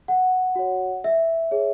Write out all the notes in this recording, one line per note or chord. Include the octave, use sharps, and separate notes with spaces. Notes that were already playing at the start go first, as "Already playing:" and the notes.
F#5
F#4 C#5
E5
G#4 C#5